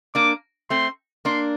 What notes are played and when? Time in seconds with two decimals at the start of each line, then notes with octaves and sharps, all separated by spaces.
0.15 A#3 D4 D6
0.70 A3 C4 C6
1.25 A#3 D4 C6